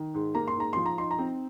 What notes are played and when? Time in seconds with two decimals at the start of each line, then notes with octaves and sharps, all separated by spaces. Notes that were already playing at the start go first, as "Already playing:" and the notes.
Already playing: D#3
0.14 G#2
0.35 A#3 A#5
0.47 C6
0.56 G#2 A#5
0.73 F3 C6
0.86 A#5
0.98 D#4 C6
1.11 A#5
1.18 C4